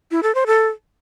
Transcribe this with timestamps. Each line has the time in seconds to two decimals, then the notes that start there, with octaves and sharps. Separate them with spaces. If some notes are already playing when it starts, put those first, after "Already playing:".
0.11 E4
0.23 A4
0.35 C5
0.47 A4